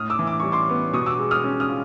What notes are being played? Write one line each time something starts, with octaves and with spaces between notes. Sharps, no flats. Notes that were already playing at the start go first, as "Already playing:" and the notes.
Already playing: A2 D#6 F6
D6 E6
E3
D6
G3 C#6
C6 D6
B3
B2 C#6 D#6
D6 E6
G#3
D#6 F6
C#4
D#6 F6
F4